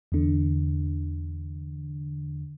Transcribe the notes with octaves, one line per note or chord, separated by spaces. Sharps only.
E2 D3